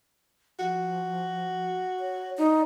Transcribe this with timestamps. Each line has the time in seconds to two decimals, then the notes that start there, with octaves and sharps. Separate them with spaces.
0.60 F3 F#4
2.00 C#5
2.38 D#4 D5